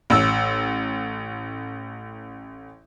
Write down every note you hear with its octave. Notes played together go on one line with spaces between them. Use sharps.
A1 E6